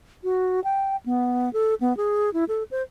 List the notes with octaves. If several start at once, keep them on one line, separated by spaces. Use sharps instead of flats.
F#4
G5
B3
A4
B3
G#4
E4
A4
C5